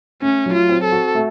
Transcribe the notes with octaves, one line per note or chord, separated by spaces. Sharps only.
A3 C#4
F#3
F4
C4
A4
F#4
A3